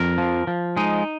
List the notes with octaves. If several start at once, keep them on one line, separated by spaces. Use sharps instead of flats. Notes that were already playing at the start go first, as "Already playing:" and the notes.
Already playing: F2 A#4
F3
F3
G#3 D#4